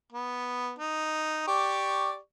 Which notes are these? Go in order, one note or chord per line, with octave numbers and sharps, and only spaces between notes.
B3
D#4
G4 D5 C#6